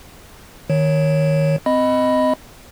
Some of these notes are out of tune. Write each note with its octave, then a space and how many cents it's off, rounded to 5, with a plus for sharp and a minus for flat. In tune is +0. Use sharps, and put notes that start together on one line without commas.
D#3 +0 C#5 +0
C4 -20 D#5 +0 B5 +0